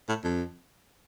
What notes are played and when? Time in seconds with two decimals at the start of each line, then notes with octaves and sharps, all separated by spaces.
0.09 A2
0.24 F2